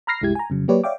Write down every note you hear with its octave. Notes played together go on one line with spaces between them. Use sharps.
A#5 B5 F6 A#6 C7
C2 F#2 G#3 E4 G4 G#6
G#5 A#5
F2 C#3 F#3
F#3 A#3 G4 B4 C#5 D5
C#5 D5 E5 F5 G5 D6